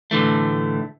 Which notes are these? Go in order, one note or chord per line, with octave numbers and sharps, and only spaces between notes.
A2 D3 E3 A3